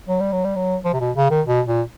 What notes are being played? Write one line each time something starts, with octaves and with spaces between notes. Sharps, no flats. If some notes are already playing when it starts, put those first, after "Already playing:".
F#3
G3
F#3
G3
F#3
F3
C3
B2
C#3
D#3
B2
A#2